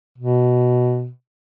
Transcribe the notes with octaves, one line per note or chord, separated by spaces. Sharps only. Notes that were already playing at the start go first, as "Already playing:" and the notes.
B2